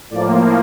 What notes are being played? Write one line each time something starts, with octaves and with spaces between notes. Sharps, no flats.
A2 F3 A#3 D5